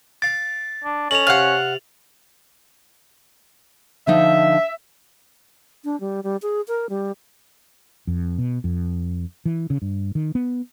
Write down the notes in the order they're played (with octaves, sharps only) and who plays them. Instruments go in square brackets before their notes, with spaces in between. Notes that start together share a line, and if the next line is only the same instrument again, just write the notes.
[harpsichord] F5 D6 [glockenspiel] A6
[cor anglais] D4
[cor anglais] C#4 [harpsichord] A4 D#5 [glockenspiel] F7 F#7
[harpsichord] C3 C4 [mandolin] F5 F#5
[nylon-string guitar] D3 F3 D#4 [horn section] E5
[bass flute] D4
G3
G3
G#4
A#4
G3
[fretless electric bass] F2
B2
F2
E3
C#3
G2
D#3
B3